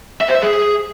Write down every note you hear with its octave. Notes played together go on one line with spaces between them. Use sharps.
E5
C5
E5
G#4